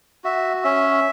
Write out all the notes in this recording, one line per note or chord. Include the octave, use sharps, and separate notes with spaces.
F#4 E5
C#4 E5